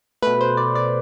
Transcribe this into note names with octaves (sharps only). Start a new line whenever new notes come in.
B2 A3 B4
C5
D5
D5